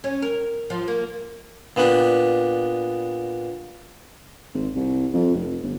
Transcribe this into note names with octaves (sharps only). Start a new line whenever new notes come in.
C#4
A#4
F3
A#3
A#2 B3 D4 G4
G#1
C2
F2
F1
G1